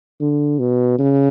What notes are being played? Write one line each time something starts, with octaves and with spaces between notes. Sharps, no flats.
D3
B2
C#3